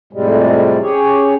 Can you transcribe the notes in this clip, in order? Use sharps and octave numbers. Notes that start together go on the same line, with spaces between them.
F2 A2 C3 G3 G#3
C#4 G4 G#4 C#5